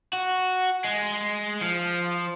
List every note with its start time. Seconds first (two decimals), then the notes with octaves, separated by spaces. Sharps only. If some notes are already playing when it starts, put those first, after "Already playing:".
0.13 F#4
0.85 G#3
1.61 F3